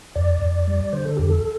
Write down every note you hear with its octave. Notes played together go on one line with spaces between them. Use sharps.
F2 D5
F2
G3
D3 C5
A4
F2 G4
A4